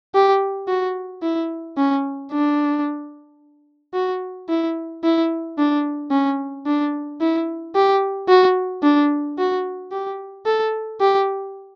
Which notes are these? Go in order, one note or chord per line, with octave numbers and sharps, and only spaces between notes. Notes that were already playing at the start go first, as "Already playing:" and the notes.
G4
F#4
E4
C#4
D4
F#4
E4
E4
D4
C#4
D4
E4
G4
F#4
D4
F#4
G4
A4
G4